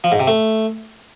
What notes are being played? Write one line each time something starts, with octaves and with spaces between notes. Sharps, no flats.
F3
G#2
C3
A3